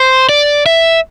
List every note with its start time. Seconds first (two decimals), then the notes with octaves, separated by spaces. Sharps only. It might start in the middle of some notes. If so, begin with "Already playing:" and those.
Already playing: C5
0.29 D5
0.66 E5